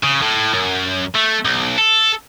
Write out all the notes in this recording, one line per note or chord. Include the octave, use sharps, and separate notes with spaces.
C#3
A2
F#2
A3
B1
A4